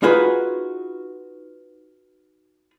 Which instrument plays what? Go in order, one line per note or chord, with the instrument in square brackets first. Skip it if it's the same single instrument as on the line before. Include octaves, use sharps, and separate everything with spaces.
[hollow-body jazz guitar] D#4 F4 F#4 G#4 B4